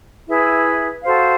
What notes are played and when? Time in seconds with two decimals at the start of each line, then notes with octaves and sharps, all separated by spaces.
0.28 E4 G#4 B4 E5
1.02 F#4 A4 C5 F5